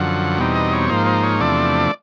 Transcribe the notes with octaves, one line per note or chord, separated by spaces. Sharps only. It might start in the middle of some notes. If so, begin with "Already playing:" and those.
Already playing: F#2 D3 F3 F#5
E2 B2 G3 C4 D#4
D#5
C#5
G#2 F3 A#3 D#4 C5
C5
C#5
E2 C3 F3 A3 D4 D5